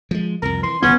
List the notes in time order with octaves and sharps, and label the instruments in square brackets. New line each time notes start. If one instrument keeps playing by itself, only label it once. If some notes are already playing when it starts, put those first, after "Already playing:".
[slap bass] F3 G#3
[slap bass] C2 F2 [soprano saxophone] A#4
[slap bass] E3 [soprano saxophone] C6
[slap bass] G1 C#3 F3 [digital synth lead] B3 [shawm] C#4